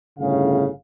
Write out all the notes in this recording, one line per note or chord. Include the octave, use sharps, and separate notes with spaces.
G1 A2 C#3 F5